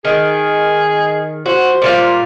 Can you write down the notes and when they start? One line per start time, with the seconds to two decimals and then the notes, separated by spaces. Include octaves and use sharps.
0.05 D#3 G#4
1.46 F#4 C5
1.82 A#2 G3 F4